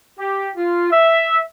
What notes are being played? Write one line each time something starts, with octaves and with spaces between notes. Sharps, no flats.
G4
F4
E5